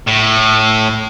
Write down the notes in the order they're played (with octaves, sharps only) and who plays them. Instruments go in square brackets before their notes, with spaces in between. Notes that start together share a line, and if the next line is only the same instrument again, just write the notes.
[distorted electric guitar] A2